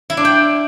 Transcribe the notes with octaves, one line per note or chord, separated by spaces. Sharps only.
E4
D4
G5